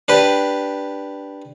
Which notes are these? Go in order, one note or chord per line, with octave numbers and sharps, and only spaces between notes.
D4 G4 B4